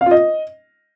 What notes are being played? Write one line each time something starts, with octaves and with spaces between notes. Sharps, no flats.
F5
F4
D#5